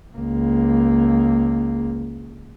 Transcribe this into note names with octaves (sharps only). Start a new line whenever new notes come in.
C#2 A#3